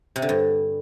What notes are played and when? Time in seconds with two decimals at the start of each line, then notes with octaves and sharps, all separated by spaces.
0.16 C3
0.22 D3
0.29 G2